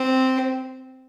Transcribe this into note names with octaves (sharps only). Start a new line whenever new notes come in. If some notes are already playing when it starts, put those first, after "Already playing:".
Already playing: C4